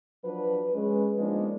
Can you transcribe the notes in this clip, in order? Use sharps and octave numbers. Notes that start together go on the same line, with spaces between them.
F3 F#3 D4 B4
G#3 C#4 B4
F3 G#3 A#3 B3 D4 D#4